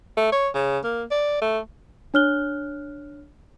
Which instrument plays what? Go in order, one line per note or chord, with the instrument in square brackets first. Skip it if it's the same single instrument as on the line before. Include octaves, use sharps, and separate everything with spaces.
[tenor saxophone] A3
C#5
C#3
A#3
D5
A3
[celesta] D4 C#5 F6 F#6 G7